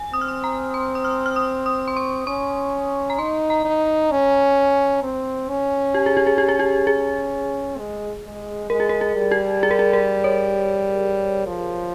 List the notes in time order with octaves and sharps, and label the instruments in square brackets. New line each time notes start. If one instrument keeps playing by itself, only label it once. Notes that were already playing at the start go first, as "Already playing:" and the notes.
Already playing: [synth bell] G#5
[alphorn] C4 [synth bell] D#6
[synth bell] F6
D#6
A#5
C6
D#6
F6
F6
D#6
D#6
C6
C#6
[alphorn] C#4 [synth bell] C#6
[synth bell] A#5
[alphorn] D#4 [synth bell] C6
[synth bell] A#5
[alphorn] D#4
C#4
C4
C#4
[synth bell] G4
G#4
G4
G#4
G4
G#4
G4
G#4
[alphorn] G#3
G#3
[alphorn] G#3 [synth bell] A#4
[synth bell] G#4
A#4
G#4
[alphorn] G3
[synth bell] G4
G#4
A#4
G#4
A#4
C#5
[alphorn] F3